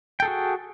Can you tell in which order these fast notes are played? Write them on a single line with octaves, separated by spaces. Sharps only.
G5 A4 G#4 F#4